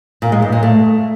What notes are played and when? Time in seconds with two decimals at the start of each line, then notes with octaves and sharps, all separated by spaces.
0.22 A#2
0.32 G#3
0.42 G2
0.52 A#2
0.63 A3